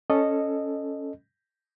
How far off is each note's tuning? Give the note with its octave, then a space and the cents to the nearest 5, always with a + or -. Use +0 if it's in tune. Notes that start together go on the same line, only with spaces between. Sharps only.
C#4 +0 A4 +0 D#5 -15